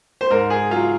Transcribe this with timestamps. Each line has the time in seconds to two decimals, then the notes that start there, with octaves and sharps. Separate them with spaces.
0.21 C5
0.30 G#2 A#4
0.50 G#4
0.70 F#3 F4